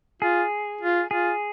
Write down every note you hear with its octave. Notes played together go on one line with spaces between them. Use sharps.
F4 G#4
F4
F4 G#4